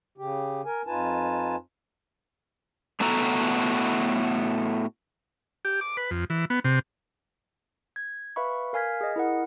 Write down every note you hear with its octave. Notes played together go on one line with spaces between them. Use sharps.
C#3 G4
A#4 G#5
F2 D#4 F4 B4 G#5 A5
A2 A3 B3 F#4 A4 A#5
G4
D6
B4
F2
E3
B3
C3
G#6
B4 E5 F5 B5 C#6
A#4 F5 G#5 F6 G#6 B6
G#4 D#5
E4 A#4 F#5